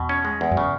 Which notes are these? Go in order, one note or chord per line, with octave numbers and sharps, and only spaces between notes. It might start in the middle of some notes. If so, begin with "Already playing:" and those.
Already playing: E2 B2
C#4
G#3
E2
F#2
C#3